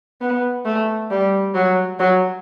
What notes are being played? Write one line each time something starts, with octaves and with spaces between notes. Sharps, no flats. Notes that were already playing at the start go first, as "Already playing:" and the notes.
B3
A3
G3
F#3
F#3